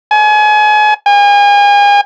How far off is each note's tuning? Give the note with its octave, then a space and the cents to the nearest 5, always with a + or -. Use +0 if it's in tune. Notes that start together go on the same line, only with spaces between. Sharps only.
G#5 +35
G#5 -35